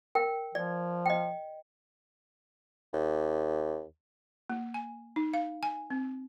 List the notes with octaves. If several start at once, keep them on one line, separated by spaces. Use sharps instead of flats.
A#4 G5
F3 D5
D#5 G5
D#2
A#3
G#5
D#4
F5
G#5
C4